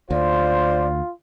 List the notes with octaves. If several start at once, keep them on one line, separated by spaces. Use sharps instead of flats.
D2 F4 C5 D5